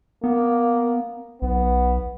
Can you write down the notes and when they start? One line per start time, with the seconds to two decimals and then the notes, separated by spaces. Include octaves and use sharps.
0.24 A#3 B3
1.42 B1 B3